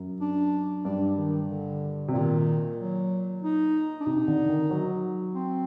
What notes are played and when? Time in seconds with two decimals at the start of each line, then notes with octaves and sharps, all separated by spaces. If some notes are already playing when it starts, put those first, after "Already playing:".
Already playing: F#2
0.21 D4
0.85 G2 D4
1.17 D#3
1.49 D3
2.08 C3
2.13 A#2 D#3
2.77 F#3
3.42 D#4
4.00 D4
4.06 C3 D#4
4.28 D3
4.49 D#3
4.70 F#3
5.34 C4